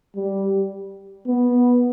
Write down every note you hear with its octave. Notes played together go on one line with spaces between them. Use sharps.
G3
B3